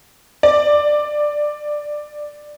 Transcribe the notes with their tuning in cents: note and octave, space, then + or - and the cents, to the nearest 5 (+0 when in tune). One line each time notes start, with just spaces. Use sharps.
D5 +10